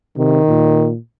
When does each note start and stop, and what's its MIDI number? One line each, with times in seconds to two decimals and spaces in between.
0.17 0.40 48
0.17 0.89 51
0.48 0.97 46